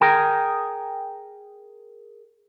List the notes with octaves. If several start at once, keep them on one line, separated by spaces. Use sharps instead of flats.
G#4 A#4 G5